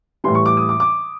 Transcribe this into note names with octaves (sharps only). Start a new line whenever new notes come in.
A2 E3 G3 C6
C#6
D6
D#6
D6
D6